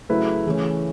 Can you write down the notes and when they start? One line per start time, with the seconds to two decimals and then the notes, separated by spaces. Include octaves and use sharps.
0.09 C#3 F#3 A3 E4 B4
0.46 C#3 E3 A3 C#4